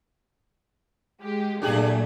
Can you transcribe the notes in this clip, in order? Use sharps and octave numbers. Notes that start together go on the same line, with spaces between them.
G#3 G4
A#2 F#3 A3 D4 G4 G#4